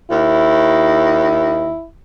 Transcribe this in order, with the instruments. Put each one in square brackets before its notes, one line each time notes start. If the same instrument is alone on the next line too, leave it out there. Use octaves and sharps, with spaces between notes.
[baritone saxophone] D#2 [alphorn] E4